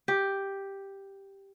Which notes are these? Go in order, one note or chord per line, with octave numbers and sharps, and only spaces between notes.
G4